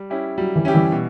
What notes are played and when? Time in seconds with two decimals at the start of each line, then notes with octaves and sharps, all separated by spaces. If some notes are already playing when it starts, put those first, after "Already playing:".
Already playing: G3
0.10 C#4 E4 G4
0.38 F#3 G3
0.56 E3
0.65 C#4 E4 G4
0.74 E3 G3
0.92 B2